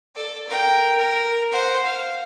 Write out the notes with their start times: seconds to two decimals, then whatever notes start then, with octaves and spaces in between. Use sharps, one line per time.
0.15 A4 D5
0.48 A#4 G5
0.97 A#4
1.52 C5 F#5
1.84 F5